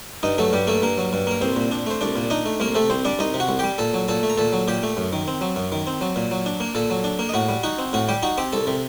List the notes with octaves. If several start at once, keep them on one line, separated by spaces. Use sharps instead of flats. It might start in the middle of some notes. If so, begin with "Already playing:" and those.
G2 D#4 D#5
F#3 A3 A4
G2 G3 G4
A3 A#3 A4
G2 A#3 A#4
F#3
G2
A#3 A#4
C2 C4 C5
A#2
D4
A3 C5
C2 D4 D5
A#2
D4 D#4 D#5
A3
C2 A#3 A#4
C3 A3 A4
C2 C4 C5
G3 D4 D5
C2 D#4 D#5
C3
F#4 F#5
C2
G3 G4 G5
A#2 A4 A5
F#3
A#2 A4 A5
A3
A#5
A#2 A4 A5
F#3
A#2 G4 G5
A3
F#2
D#3
C4
F#3
F#2
D#3
C4
F#3
A#2
F#3
D4
A#3
A#2 A4 A5
F#3
D4
A#3
D#5
A2 F#4 F#5
G3
D#4 F#4 F#5
C4
A2 F#4 F#5
G3 G4 G5
D#4 F#4 F#5
C4 G4 G5
C2 A4 A5
C3